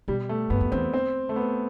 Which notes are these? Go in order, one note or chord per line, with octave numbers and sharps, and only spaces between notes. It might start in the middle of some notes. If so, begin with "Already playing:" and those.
B2 G3
A3
G2 B3
F#2
E2 C4
C4
A3
B3